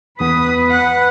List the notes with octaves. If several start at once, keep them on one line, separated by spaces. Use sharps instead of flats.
E2 B3 B4 D#6
F#5